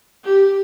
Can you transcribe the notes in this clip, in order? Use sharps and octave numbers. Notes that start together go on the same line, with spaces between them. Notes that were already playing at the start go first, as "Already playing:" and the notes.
G4